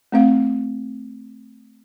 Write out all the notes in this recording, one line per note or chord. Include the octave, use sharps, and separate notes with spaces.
A3 C4 F5